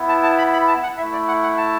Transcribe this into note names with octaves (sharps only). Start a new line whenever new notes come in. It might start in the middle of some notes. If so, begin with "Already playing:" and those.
Already playing: B3 E4
A5
A5
B5
B5
A5
F#5
A3 E4 E5
D5
F#5
F#5
A5